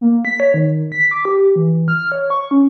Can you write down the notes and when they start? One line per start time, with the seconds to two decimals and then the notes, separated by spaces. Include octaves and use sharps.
0.01 A#3
0.25 B6
0.40 C#5
0.54 D#3
0.92 B6
1.11 D6
1.25 G4
1.56 E3
1.88 F6
2.12 C#5
2.30 C#6
2.51 C#4